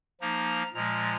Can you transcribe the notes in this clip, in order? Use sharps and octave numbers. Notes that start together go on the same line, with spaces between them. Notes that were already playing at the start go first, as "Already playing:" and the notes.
F3 A#3 D#4 A#5
A#2 F3 G#3 A#5